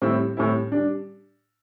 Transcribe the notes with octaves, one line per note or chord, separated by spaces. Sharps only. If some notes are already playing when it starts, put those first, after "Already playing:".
A2 G3 C4 E4
A2 G3 C4 E4
G3 D4